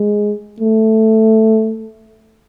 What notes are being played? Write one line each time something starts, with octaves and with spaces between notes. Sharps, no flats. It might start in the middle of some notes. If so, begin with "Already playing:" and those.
Already playing: G#3
A3